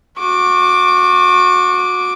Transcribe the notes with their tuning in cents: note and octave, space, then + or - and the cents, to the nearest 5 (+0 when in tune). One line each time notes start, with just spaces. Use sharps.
F#4 -30 D6 +0